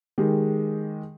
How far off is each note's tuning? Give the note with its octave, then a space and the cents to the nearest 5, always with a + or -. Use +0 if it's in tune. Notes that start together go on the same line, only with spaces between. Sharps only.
D#3 +0 G#3 +0 G4 +0